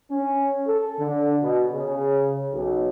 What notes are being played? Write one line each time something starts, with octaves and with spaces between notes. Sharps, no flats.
C#4
A4
D3
B2
C#3
B1